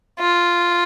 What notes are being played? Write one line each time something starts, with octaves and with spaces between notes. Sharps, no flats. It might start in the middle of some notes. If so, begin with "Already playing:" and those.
F4